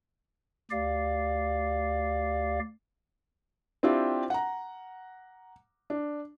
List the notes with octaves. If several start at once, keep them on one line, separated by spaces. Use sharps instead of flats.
D2 G4 D5 F5
C4 D4 E4 F4 G4
F#5 A#5
D4